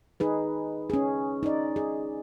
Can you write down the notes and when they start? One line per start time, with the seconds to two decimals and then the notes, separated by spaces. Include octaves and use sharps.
0.20 D#4 G#4 B4
0.90 C#4 G#4
1.43 D#4 D5
1.76 G#4